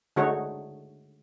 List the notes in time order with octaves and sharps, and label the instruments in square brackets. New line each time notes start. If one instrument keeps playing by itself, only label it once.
[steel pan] D3 G#3 A3 D#4 F#4 C#5